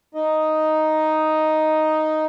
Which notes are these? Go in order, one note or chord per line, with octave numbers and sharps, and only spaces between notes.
D#4 D#5